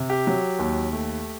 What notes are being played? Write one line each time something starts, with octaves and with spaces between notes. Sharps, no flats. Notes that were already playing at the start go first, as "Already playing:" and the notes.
Already playing: C3
G4
F#3
D#2
A3